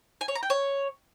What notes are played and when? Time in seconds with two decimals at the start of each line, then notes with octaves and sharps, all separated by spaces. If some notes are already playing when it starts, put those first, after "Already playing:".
0.21 G#5
0.28 C#5
0.35 A#5
0.43 G5
0.50 C#5